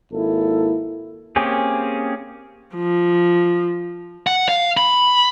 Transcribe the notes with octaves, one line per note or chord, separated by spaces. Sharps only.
G#1 A#3 E4 A4
A#3 C4 C#4 G4 G#4
F3
F#5
F5
B5